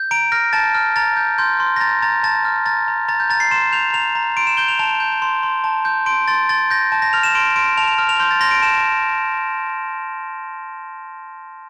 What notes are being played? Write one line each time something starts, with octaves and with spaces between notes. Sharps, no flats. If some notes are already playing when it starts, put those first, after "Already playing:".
Already playing: G6
A#5 D7
F6 A#6
A5 A6
F6
A#5 A6
G6
C6 G6
C6
A#6
A#5 A6
A#5 A6
A5 A6
F6
A#5 A6
A#5
A#5 A6
G6
A#5 A6
C7
C6 E7
G6 F7
A#5 F7
A#5
C6 D7
E7
G6 G7
F7
A5 F7
G6
C6
C6
A5
G6
C6 D7
C6 A6
C6 A6
G6 A#6
A5
A#6
F6 F7
E7
C6 D7
C6 D7
A5 F7
F7
F6
F7
C6 G6
A6
C6 A#6
D7
A5 E7